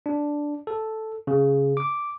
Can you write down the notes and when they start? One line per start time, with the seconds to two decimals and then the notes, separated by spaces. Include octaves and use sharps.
0.06 D4
0.67 A4
1.27 C#3
1.77 D6